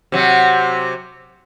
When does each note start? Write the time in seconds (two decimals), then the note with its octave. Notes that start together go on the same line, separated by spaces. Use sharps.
0.12 C3 F#3